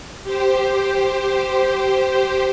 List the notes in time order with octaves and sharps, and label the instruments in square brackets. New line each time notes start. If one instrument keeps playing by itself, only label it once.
[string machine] G4 C5